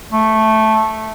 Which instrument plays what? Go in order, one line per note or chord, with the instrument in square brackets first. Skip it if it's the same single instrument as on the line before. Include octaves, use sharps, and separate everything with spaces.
[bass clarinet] A3